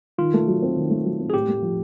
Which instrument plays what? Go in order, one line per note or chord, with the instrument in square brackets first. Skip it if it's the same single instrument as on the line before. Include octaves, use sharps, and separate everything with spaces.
[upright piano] D#3 [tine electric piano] F4
[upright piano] A3
F#3
C4
D#3
A3
F#3
C4
[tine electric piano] G#4
[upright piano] A2 [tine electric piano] G4
[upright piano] A3
F3